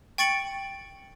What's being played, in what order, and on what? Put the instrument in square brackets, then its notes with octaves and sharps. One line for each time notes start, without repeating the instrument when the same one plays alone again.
[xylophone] G5 C#6 A6 C#7 D7 F#7